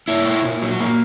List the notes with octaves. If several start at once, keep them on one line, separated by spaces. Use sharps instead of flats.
A#3 E4
A#2
A#2
F#3
A#3